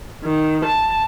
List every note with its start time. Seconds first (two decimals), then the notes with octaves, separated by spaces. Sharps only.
0.24 D#3
0.65 A5